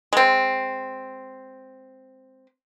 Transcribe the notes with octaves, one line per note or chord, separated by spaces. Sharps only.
G#3 C4